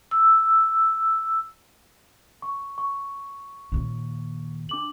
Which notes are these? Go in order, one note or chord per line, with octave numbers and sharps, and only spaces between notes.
E6
C#6
C#6
D#2 A#2
D4 D6 F#7